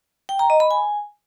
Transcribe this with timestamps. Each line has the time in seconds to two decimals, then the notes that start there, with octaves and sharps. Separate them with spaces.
0.29 G5
0.39 A#5
0.50 D#5
0.60 B5
0.71 G#5